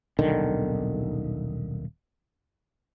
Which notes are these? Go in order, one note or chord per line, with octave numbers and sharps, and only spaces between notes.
D#1 B1 D3 D#3